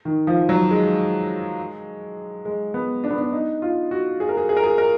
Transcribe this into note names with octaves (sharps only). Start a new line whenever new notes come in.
D#3
F3
F#3
G#3
G#3
B3
D4
B3
D4
D#4
F4
F#4
G#4
A#4
G#4
G#4
A#4
G#4
A#4